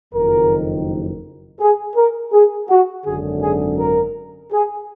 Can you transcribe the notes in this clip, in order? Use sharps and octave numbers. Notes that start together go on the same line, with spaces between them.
F#1 F2 D#3 A#4
G#4
A#4
G#4
F#4
G#1 F#2 D3 G#4
G#4
A#4
G#4